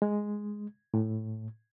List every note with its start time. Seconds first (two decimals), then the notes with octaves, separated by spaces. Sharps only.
0.02 G#3
0.94 A2